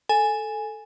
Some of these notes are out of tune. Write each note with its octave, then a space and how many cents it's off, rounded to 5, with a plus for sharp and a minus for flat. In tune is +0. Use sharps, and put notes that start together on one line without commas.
A4 +0 G#5 +0